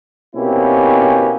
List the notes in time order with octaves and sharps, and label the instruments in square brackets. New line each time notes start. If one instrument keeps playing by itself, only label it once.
[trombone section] B2 A#3 C4 C#4 E4 G4